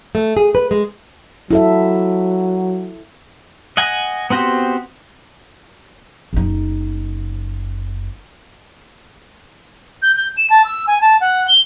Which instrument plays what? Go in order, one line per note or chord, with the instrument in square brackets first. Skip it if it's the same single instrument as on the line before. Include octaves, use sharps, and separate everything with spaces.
[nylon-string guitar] A3
G#4
B4
G#3
[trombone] F#3 [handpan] E4 A4 E5
[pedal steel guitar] D#5 F#5 G#5
B3 C4 F#4 G4 C5
[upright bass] F#1 D#4
[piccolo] G6
G6
E7
A5
E6
G#5
A5
F#5
G7